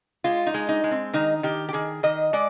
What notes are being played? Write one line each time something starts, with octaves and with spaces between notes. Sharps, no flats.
G#3 F4
D#4
G#3
D#4
G#3
C4
D#3 D#4
D#3 G4
G4
D#3 G#4
D#3 D#5
G#3 D5